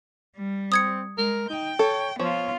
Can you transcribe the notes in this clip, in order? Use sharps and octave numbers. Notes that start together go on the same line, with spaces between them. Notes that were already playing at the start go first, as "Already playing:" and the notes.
G3
C4 D#6 G#6 C#7
G#3 A#4
D#4 G5
A4 C#5
F3 B3 F4 C#5